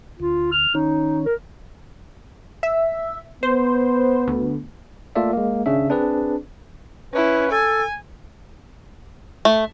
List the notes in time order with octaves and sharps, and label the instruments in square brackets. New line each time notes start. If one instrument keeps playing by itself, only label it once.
[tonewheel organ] D2 [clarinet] F4
[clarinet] F6
[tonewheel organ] D#3 C#4 [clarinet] D#4
[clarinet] A#4
[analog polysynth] E5
[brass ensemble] B3 [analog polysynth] C5
[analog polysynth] D2
[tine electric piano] A3 A#3 F4 A4 D5 E5
G#3 A#3
G#1 C#3 C#4 D4 E5
C4 D4 G#4 B4 D5
[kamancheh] C#4 E4 [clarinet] B4
[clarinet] A4 [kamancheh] G#5
[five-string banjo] A3